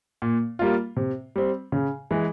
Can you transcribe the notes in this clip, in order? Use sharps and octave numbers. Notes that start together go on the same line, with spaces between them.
A#2
G3 A#3 F4
C3
G3 C4
C#3
E3 G#3